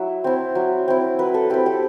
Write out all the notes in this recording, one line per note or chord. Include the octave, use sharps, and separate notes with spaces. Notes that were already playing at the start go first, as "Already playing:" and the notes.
Already playing: F#3 E4 E5
C4 E4
F#3
C4 E4
F#3 B4
A4
C4 E4 G4
G4